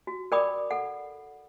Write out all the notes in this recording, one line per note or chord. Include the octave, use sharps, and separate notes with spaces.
F#4
A#4 D5 G5 B5 D6 D#6
A4 F#5